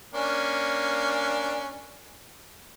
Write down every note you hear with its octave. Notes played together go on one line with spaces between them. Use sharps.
A#3 C#4 D4